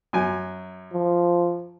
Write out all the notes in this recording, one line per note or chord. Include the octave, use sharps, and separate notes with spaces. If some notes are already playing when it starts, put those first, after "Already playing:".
F#2 G#5
F3